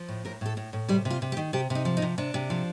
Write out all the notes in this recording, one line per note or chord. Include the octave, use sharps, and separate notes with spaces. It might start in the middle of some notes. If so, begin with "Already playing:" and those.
Already playing: F3
A2
A2 A#4
A2 A4
A2
A2
C3 G3
C3
F4
C3
G4
D#3
C3 G4
C3
D#4
F3
D#4
C3
C3 D4
C3
F3